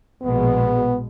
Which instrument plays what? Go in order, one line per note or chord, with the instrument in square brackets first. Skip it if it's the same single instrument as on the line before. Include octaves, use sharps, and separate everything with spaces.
[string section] A#1 B2 G#3 [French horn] B3